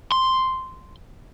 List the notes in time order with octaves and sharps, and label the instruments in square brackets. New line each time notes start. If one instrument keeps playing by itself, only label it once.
[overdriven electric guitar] C6